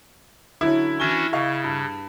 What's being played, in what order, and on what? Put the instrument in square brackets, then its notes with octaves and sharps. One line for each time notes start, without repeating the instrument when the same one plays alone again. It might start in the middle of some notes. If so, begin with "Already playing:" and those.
[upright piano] D3 F#3 C#4 [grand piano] E4
[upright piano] E3 G#6 G7 [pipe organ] C#4 D4 F#4
[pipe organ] C#3 [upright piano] D#5 F5 C#6
[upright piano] G2